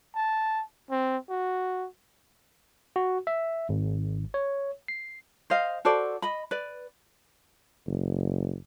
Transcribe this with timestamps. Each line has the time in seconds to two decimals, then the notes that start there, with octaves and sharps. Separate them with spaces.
0.15 A5
0.91 C4
1.30 F#4
2.96 F#4
3.27 E5
3.69 G#1
4.34 C#5
4.88 C7
5.50 C5 D#5 F5
5.85 F#4 A4 C5 D5
6.22 D#5 B5
6.51 B4 D5
7.87 F#1